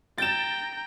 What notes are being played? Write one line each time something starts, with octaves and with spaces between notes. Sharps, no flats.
G5 A#5 A6 E7